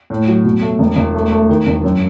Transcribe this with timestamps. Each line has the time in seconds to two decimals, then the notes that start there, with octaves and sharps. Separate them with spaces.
0.10 A2
0.27 F#3
0.45 B2
0.62 A3
0.79 E1
0.96 E1
1.14 A3
1.31 A3
1.49 D#3
1.67 E1
1.84 F#2